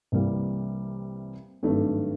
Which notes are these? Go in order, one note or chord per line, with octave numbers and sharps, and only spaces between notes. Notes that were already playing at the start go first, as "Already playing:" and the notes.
C2 C3 E3 G3 A#3
G#1 G2 D#3 F#3 A3